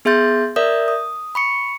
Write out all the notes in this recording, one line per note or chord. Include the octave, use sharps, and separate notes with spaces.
B3 G#4 E5 C6 G6 A6
A#4 D5 E5 D#6 G6
D#6
B5 C#6 C#7